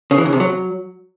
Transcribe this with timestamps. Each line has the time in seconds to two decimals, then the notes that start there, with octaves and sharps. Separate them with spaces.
0.11 C#3
0.18 E3
0.25 C#3
0.33 C3
0.40 F#3